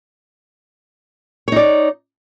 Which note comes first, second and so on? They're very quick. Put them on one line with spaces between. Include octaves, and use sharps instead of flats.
C#5 D#4 D5